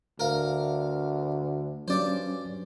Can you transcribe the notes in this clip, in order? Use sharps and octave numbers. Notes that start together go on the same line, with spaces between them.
D2 A#4 F5
G2 F#3 C#4 C5 D5